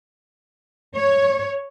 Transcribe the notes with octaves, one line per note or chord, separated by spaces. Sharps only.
C#5